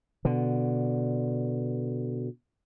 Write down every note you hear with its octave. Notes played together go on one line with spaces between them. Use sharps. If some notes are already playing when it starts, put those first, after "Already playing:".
B2 D3